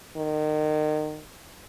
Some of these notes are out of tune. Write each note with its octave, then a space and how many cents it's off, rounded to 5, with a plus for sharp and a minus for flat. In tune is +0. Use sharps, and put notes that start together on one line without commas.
D#3 -30